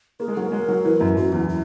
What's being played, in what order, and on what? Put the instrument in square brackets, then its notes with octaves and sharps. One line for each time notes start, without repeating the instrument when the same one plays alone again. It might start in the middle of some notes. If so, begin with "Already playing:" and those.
[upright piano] A#3 [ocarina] G#4
[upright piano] G#3
[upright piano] F#3 [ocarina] A#4
[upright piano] A#3
G#3
F#3
E3
F#2
[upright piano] F#2 [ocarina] F#4
[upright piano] E2 [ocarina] E4
[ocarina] E4